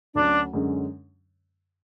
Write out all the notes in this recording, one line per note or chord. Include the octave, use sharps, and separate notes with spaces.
D2 D3 F#3 C#4 D4
F#2 D3 G#3 C#4